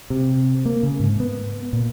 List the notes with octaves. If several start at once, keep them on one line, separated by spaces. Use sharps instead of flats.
C3
A#3
C#3
G#2
B3
A#2